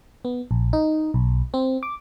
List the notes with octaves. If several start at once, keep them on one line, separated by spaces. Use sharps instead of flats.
B3
A#1
D#4
B1
C4
D6